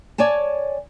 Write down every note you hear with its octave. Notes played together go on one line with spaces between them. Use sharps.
C#5 D5 G#5 A5